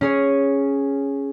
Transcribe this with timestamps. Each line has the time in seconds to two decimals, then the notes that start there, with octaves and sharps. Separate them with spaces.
0.01 C#4 G#4 C#5